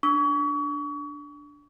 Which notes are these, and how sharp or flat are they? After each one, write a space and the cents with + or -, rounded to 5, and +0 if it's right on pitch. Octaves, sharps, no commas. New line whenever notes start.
D4 +0 C#6 +35